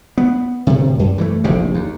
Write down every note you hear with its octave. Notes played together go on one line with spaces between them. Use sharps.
B3
D1 C3
F#2
E3 F3 A3
F1 A#1 D#2 C3
D#2